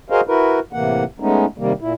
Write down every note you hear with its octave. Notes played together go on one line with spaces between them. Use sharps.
F#4 G#4 A#4 C5 D#5 F5
E4 F#4 A#4 B4
A2 C3 E3 A#3 F#5
G#3 A3 B3 C#4 D#4
C3 D#3 G3 A#3
A#2 E4